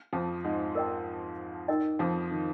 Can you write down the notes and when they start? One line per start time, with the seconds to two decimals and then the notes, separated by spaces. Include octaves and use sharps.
0.13 F2 F3
0.44 G#2 G#3
0.75 A#4 D#5 G5
1.68 D#4 A#4 D#5 G5
1.99 F2 F3
2.31 D#3